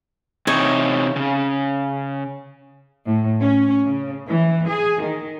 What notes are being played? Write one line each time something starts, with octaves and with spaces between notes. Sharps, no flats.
C3 E3 D#4 C#5
C#3
A2
C#4
C#3
E3
G#4
D#3